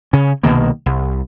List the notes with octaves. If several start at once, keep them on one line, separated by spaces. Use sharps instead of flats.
C#3 C#4
C2 B2 D#3 A#3
C2